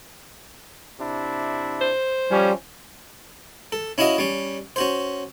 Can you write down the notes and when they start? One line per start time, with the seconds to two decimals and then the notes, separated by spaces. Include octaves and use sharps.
1.00 C3 D4 E4
1.81 C5
2.31 F3 G3 C#4
3.72 A4
3.98 C#4 E4 F#4 D#5 F5
4.18 G3 C#4
4.76 C#4 F#4 C5